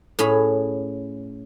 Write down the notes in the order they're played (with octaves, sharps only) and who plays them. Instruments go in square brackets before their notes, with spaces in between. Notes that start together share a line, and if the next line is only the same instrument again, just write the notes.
[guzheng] A2 C#4 G#4 B5